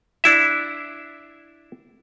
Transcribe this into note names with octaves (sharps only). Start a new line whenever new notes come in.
D4 E4 E5